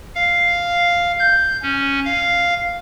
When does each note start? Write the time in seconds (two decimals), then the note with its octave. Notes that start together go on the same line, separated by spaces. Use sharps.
0.15 F5
1.20 G6
1.62 C#4
2.05 F5